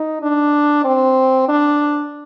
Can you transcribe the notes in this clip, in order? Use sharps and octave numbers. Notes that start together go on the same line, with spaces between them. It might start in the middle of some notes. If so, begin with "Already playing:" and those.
Already playing: D#4
D4
C4
D4